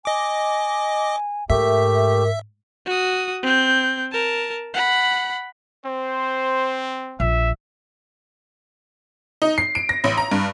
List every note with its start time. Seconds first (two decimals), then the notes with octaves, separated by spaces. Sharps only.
0.05 D#5 G#5 D6
1.50 G#2 A3 G4 A#4 E5
2.86 F#4 D#6
3.42 C4 G6
4.12 A#4 A5
4.74 F#5 B5
5.86 C4 C5
7.20 A#1 E5
9.42 D#4
9.58 C7
9.75 D7
9.89 A#6
10.04 A1
10.17 A#5
10.32 G2